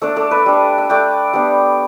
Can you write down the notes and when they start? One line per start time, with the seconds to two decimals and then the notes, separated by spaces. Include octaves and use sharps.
0.02 A3 D4 A4 D5
0.16 A4 D5
0.31 B4 E5
0.46 G3 D4
0.78 E5
0.90 A3 D4 D5 G5
1.33 G3 B3 D4